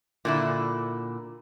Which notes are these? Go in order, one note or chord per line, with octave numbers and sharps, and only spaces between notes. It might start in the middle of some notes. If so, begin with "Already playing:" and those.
A#2 D3 E4